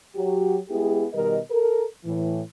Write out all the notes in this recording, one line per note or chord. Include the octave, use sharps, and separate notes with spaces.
F#3 F#4 G4
G#3 B3 E4 G4 G#4
B2 D#3 G3 A#4 D#5
A4 A#4
A2 E3